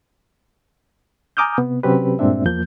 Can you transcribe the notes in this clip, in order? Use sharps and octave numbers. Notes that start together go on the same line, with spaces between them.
G#5 A#5 D6 D#6 F6 G6
C3 B3
C3 F#3 C4 C#4 G4 B4
G2 A#2 G#3 C4 D4 E5
E2 F3 A#3 G6